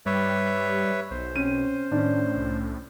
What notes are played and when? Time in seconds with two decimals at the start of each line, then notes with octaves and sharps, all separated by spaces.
0.06 G2 G3 B4 C#5 E5
1.11 B1 C5
1.36 C4 C#4 D#7
1.92 A2 D#3 C#4 D4
2.37 C2